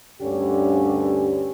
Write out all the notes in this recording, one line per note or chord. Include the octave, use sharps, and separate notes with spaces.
D2 G2 D3 C#4 G4